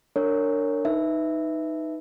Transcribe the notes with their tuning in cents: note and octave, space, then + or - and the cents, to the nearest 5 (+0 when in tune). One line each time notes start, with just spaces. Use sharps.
D4 +0 A#4 -25 C#5 +0
D#4 +0 B4 +5 E5 +0